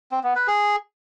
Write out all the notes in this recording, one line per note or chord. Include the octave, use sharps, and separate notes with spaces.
C4
B3
B4
G#4